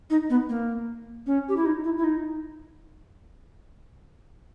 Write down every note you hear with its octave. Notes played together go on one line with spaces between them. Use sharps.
D#4
B3
A#3
C#4
G4
E4
D#4
E4
E4
D#4